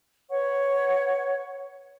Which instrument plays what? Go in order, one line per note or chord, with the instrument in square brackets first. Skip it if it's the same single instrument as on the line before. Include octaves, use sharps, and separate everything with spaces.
[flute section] B4 C#5 F#5 C#6